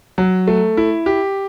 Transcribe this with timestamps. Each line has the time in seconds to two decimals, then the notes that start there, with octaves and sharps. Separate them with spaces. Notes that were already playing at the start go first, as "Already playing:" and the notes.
0.18 F#3
0.48 A3
0.77 E4
1.06 G4